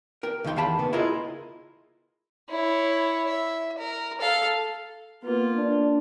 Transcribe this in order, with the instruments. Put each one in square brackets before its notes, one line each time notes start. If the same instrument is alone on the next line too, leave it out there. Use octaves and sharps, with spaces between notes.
[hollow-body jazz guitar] A#4 G5
C#2 D#3 D#4 G5 C6
E2 F5 G5 A5 B5
C#3 A#3 B3
E4 F4 G#4 A#4 C5 D#5
[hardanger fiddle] E4 C#5
E5
A#4
A4 F5
[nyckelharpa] A#3 F4 [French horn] B3
[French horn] D4